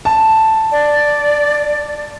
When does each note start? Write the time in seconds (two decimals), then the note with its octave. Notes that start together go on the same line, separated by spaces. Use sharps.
0.05 A5
0.72 D5